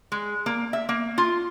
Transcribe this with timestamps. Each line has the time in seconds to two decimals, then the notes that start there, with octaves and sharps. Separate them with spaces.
0.12 G#3
0.46 A#3
0.73 E5
0.89 A#3
1.18 F4